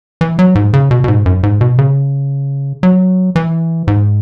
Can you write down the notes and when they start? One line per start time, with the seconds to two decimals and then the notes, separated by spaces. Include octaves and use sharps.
0.21 E3
0.39 F#3
0.55 G#2
0.73 C#3
0.91 B2
1.04 B2
1.08 G#2
1.26 F#2
1.43 G#2
1.61 B2
1.79 C#3
2.83 F#3
3.36 E3
3.87 G#2